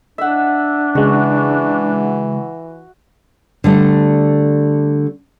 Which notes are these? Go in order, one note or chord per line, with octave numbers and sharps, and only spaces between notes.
D4 E5 F#5
C#3 E3 G#3 F#4
D3 G3 A3